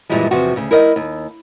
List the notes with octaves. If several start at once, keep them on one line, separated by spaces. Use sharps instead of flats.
F#2 A#2 E3 F3 G3 G#3
E2 C3 F3 F4 F#4
D2 C#3
E4 A#4 D5 D#5
D#2